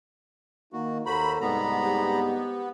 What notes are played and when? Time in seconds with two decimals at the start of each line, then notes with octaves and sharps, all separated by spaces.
0.73 D#3 A#3 D#4 F#4
1.06 D#2 F#4 A4 C5 A#5 B5
1.41 C2 G#2 G3 B3 A#5 B5
1.83 G4